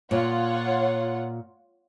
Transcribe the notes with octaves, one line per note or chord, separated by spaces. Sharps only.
A#2 F4 C#5 F#5